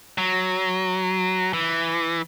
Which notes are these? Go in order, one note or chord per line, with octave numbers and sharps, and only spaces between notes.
F#3
E3